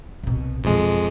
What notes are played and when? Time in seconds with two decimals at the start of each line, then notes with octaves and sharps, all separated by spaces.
0.23 C2 B2
0.64 F2 B2 E3 G#3